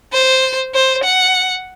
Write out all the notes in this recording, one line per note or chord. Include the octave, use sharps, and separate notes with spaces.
C5
C5
F#5